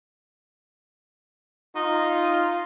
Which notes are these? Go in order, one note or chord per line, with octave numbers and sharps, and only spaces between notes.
D#4 F4